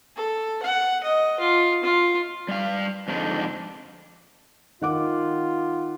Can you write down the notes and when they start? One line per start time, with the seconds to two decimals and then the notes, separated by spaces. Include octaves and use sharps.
0.17 A4
0.63 F#5
1.04 D#5
1.40 F4
1.84 F4
2.48 G3 F5
3.08 F2 G#2 D3 D4 D#4
4.82 D#3 F4 F#5 D6